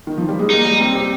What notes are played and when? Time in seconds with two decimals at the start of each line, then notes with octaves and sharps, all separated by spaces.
0.07 D#3
0.18 F3
0.29 G3
0.39 G#3
0.50 A#3 D#4
0.65 G3
0.80 C4
0.95 G4